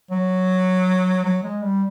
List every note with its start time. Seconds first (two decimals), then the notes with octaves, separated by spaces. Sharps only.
0.11 F#3
1.24 F#3
1.43 G#3
1.62 G3